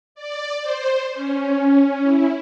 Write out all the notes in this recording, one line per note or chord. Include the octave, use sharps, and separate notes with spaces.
D5
C5
C#4
E4